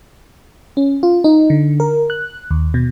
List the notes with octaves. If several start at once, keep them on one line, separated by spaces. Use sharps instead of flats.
C#4
F4
D#4
D3
A#4
F#6
D#2
B2